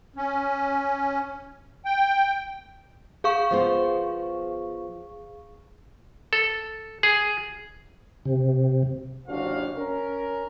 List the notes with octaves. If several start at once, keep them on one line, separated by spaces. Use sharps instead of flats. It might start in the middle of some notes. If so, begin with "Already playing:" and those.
C#4
G5
G#4 F5 C#6
F3 B3 C5
A4
G#4
C3
F#1 D#2 C3 D4 F#4 F5
C#4 A#4